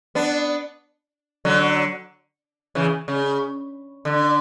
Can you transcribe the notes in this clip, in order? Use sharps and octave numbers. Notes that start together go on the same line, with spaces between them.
B3 D4
D3 F#3
C#3 E3
C#3
D3